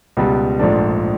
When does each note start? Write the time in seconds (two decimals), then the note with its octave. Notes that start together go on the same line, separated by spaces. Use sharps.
0.17 C#2 B2 G3
0.59 A#1 G#2 F3 A3 D4